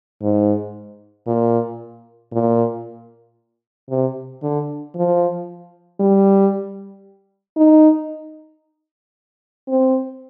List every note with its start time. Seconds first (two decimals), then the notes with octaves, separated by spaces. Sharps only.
0.21 G#2
1.27 A#2
2.32 A#2
3.89 C3
4.43 D3
4.95 F3
6.00 G3
7.57 D#4
9.68 C4